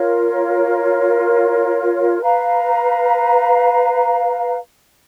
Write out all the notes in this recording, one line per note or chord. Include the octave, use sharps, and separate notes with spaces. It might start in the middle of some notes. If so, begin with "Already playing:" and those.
Already playing: F4 A#4 C#5
B4 F5 A#5